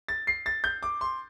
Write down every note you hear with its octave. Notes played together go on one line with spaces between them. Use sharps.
A6
C7
A6
G6
D6
C6